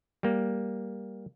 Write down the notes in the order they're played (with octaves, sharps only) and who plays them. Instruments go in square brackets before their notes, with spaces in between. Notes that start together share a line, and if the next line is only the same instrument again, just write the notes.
[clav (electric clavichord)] G3 A#3